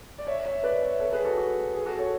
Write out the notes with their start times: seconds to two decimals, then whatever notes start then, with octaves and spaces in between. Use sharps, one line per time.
0.18 D5
0.27 C#5 E5
0.46 C#5 E5
0.63 B4 D5
0.82 C#5 E5
1.00 A4 C#5
1.12 G#4 B4
1.25 F#4 A4
1.37 F#4
1.74 G#4
1.86 F#4 A4
1.98 A4 C#5